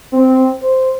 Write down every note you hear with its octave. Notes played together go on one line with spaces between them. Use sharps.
C4
C5